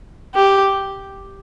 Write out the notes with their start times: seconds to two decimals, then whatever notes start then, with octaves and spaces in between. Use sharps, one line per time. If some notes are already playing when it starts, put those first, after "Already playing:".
0.35 G4